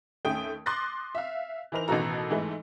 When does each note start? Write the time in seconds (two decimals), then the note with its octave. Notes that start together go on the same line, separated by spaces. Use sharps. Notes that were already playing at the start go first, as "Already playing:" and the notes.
0.25 D#2 A3 C#4 G5 D#6 D7
0.66 C6 D6 D#6 F#6 A6 A#6
1.15 E5 F5
1.72 E3 D#4 A#4 C5 F7
1.88 A1 B2 D#3 F#4 A4 A#5
2.30 G#2 E3 G#3 A3